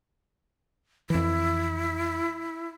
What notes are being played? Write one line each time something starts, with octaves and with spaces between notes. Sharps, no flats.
F2 E3 E4